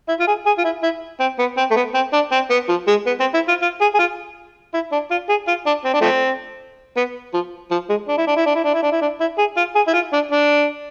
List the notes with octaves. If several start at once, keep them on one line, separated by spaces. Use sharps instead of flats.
E4
F4
G#4
G#4
F4
E4
E4
C4
B3
C4
A3
B3
C4
D4
C4
B3
F3
G#3
B3
C4
E4
F4
F4
G#4
G#4
F4
E4
D4
F4
G#4
F4
D4
C4
D4
F3 A3 C4
B3
F3
F3
G#3
D4
E4
D4
E4
D4
E4
D4
E4
D4
E4
D4
E4
G#4
F4
G#4
E4
F4
D4
D4